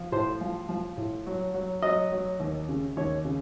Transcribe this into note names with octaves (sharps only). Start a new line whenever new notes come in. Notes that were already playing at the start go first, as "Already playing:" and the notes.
Already playing: F3
A2 C5
F3
F3
A2
F#3
F#3
F#3 D#5
F#3
D#2
C#3
D#2 C#5
C#3